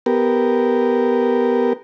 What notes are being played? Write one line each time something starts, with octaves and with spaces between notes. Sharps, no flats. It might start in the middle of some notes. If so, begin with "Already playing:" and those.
B3 G4 A#4